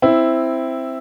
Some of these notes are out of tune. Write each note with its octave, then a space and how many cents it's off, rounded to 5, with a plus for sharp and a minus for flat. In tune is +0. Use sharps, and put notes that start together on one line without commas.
C4 +0 E4 +0